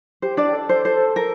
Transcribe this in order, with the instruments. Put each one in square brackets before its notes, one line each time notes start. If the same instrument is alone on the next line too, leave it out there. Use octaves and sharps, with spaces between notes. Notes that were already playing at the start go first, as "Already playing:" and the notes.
[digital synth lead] G4 [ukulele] C5
[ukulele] D4 D5
[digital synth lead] A4
[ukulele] C5
[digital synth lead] A4 [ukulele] C5
[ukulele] A#4